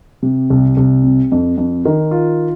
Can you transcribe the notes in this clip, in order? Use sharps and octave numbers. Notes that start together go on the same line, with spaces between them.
C3
C2
C2
C3
F2
F2
D#3
F4